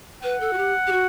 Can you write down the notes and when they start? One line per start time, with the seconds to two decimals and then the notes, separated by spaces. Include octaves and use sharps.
0.23 B4 F#5
0.40 A4
0.53 F#4
0.58 G4
0.87 G4
0.92 F#4